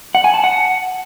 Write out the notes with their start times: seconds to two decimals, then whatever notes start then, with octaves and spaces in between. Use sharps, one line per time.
0.15 F#5
0.24 G#5
0.34 A5
0.44 F#5